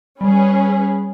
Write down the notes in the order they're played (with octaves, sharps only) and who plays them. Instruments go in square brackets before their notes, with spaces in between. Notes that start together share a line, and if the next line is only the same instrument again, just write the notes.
[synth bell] G3 [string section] C#4 G#4 B4